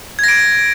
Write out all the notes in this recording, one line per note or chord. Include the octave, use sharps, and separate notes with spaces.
G#6 A#6 D7